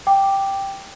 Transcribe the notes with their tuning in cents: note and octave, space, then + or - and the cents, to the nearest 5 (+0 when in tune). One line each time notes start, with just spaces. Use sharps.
G5 +0 D6 +0